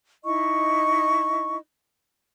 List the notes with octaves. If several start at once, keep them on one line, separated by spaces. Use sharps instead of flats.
D#4 E4 D#5 C#6